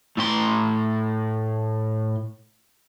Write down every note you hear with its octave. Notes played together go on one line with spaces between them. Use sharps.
A2 C6